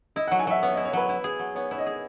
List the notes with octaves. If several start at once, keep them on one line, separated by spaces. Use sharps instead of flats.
E4 D#5
F#5
F#3
G#5
F#3 E5
B3 C#5
E4 D#5
C#5
F#3 B4
E4
G#4
F#3
B3 C#5
E4 C#5
D#5
G#4